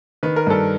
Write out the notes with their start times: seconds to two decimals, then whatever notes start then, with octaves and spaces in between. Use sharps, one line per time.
0.23 D#3 B4
0.36 A#4
0.47 G2 A4 B4